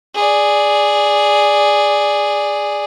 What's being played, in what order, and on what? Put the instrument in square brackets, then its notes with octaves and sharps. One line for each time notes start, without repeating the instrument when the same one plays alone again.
[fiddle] G#4 D5